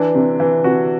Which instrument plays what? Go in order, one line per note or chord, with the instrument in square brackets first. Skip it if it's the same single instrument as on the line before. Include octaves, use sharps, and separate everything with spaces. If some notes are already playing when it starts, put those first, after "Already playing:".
Already playing: [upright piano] E3 D4
C3
E3
C3 F#4